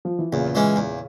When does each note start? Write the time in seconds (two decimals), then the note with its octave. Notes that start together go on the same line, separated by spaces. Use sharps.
0.05 F3
0.19 E3
0.32 E2 A#2 C#3
0.55 E3 G#3 C#4
0.76 E2